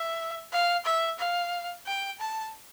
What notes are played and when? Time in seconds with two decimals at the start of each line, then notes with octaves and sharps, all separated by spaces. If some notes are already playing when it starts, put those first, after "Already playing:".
Already playing: E5
0.53 F5
0.85 E5
1.19 F5
1.87 G5
2.20 A5